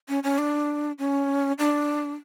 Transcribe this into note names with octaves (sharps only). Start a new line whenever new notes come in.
C#4
C#4
D4
C#4
D4